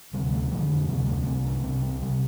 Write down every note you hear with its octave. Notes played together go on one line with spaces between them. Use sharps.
D2 C3 G3
A3
F2 D3 F3
D2 C3 G3
A3
C2 C3 C4
D4
C2 C3 C4
C4
C3 G3